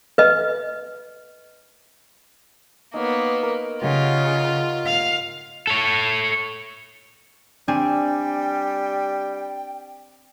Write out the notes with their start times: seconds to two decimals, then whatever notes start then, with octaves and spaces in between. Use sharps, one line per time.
0.18 B4 D#5
2.94 A#3 B3 D#4 C#5
3.43 A#4
3.82 C#3 F4 G4 D#5 F#5
4.86 F5
5.67 A4 C#5
7.68 G3 C4 D4 G5 G#5